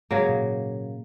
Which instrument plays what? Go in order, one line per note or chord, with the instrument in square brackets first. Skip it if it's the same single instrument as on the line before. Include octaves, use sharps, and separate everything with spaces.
[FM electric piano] G#2 [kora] C#3 F#3 A#3
[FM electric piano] A#2